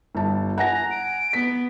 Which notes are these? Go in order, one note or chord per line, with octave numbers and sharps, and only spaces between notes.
G1 A5
F#5 G#5 A#5 A#6
D7
B3 B6